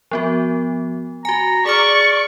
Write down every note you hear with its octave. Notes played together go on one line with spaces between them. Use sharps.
F3 B3 F#4
F#4 G#5 A#5
G#4 D5 C#6 D6 F6